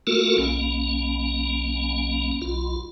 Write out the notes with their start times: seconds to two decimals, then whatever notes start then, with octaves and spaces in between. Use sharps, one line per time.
0.07 A3 A#3 F4 F#4 A4 A#4
0.38 B1 A#3 C#4
2.41 B1 F4